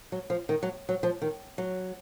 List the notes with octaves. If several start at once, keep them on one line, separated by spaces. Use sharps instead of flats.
F#3
F3
D#3
F#3
F#3
F3
D#3
F#3